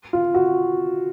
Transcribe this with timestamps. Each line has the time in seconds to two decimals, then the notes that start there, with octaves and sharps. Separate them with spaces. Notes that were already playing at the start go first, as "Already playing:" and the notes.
0.13 F4
0.34 F#4